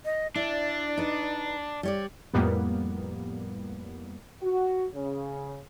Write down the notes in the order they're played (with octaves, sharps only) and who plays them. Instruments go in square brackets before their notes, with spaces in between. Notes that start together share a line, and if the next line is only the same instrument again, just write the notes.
[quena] D#5
[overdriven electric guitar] D4 [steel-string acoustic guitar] E4 [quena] D5
[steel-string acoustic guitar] D#4 B4
G3 C#5 D5
[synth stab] F2 A2 G3 A#3 B3
[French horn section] F#4
C#3